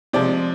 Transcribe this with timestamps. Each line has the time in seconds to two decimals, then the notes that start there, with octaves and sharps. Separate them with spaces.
0.13 C3 F3 G#3 D5